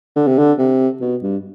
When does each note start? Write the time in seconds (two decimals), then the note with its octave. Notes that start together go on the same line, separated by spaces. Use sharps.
0.16 D3
0.27 C3
0.38 D3
0.58 C3
1.01 B2
1.22 G2